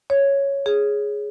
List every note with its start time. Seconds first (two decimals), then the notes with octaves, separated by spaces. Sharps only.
0.10 C#5
0.66 G#4